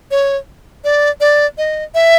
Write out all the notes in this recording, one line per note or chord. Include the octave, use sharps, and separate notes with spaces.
C#5
D5
D5
D#5
E5